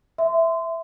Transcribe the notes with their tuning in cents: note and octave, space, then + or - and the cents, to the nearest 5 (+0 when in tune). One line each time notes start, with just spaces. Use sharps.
E5 +0 C6 -25